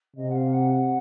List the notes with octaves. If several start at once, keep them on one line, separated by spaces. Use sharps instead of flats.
C3 D#5
F#5
F5
F#5
F#5